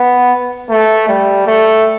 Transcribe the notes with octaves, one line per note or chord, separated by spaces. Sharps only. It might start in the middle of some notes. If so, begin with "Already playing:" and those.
Already playing: B3
A3
G3
A3